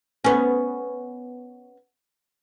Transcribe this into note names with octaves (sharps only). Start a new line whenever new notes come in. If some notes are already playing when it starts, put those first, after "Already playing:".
B3 C#4